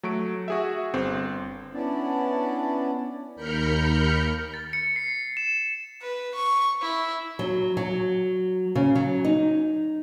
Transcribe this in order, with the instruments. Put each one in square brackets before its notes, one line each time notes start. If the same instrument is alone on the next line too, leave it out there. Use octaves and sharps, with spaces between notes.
[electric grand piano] F#3 A3 C#6 D7
F#4 G#4 E5
G1 C4
[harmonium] B3 C#4 D4 E4 D5
[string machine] D#2 A#4 B5 F6 G6 C#7
[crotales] A6
C#7
C7
E7
[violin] B4
C#6
E4
[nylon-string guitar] F#3
F#3
C#3
F#3
D#4